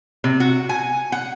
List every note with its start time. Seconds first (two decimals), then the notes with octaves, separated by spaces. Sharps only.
0.24 C3
0.40 F#4
0.69 G#5
1.12 F#5